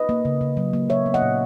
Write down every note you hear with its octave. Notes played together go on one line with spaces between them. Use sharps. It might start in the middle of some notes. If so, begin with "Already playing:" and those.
Already playing: B4 D#5
A#3
C#3
C#3
F#3
A#3
F#3 C#5 E5
B3
D#5 F#5
A#2